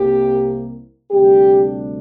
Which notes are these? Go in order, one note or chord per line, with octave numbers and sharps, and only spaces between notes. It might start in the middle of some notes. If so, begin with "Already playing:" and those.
Already playing: C2 C3 A#3 G4
D2 C3 G3 D4 G4